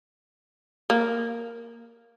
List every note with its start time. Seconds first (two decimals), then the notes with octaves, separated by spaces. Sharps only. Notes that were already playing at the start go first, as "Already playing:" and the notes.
0.90 A#3